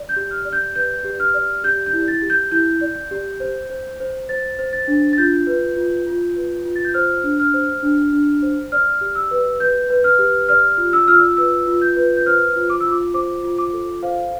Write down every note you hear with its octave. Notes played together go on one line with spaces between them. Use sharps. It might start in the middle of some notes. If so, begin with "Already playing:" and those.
Already playing: D5
G6
G4
F6
D5
G6
B4 G6
G4
F6
D5
G4 G6
G6
E4
A6
G4
G6
E4 G6
D5
G4
C5
C5
C5
C5 A6
C5
A6
D4
A6
F4 G6
B4
F4
F4
B4
F4
A6
G6
C5 F6
D4
F6
C5
D4
D4
C5
D5 F6
G4
E6
B4
B4 G6
B4
F6
G4
D5 F6
F6
F4
E6
F4 F6
E6
B4 E6
F4
G6
B4
G6
C5 F6
F4
D6
E6
F4
D6
C5 D6
F4
D6
A4
C5 F5